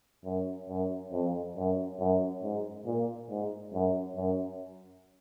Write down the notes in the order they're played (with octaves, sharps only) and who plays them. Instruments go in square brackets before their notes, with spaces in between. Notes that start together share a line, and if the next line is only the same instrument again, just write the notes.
[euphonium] F#2
F#2
F2
F#2
F#2
G#2
A#2
G#2
F#2
F#2